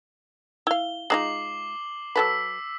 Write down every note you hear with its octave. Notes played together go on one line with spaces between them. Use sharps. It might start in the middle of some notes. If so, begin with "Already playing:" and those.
E4 F5 G7
G#3 D#4 F4 D6 C7 F#7
F#3 A4 B4 E6 B6